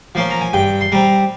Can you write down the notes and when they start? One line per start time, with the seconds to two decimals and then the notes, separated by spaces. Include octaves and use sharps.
0.15 F3 A#3 C#4 C6
0.30 A#5
0.41 G#5
0.53 G2 G5
0.81 C6
0.92 G3 C4 A#5